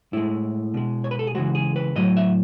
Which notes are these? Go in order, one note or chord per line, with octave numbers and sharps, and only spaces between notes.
A2 G#3 E4
B2 G#3
C#5
B4
A4
G#4
C#3 E3 G#3 F#4
G#4
B4
A2 F#3 D#5
E5